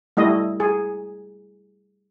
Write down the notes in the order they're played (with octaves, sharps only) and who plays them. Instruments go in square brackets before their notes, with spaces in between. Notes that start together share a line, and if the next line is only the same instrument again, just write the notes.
[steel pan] G3 A3 E4 D#5
G#4